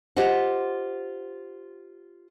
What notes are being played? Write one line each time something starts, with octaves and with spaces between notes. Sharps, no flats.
F4 G4 C5 D#5 F#5